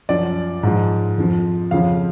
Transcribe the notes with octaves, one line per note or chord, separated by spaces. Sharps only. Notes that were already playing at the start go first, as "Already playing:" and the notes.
F#2 F3 D5
G#2 F3
F2 F3
F2 C#3 F3 F5